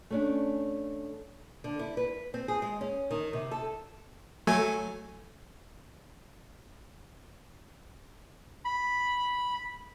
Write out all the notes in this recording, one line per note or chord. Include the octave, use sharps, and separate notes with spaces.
A3 C#4 D4
D3
E4
B4
C4
G#4
G#3
C#4
D#3
C3
A4
F#3 A3 G#5
B5